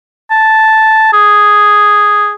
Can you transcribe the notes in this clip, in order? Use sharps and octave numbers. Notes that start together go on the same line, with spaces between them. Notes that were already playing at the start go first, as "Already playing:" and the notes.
A5
G#4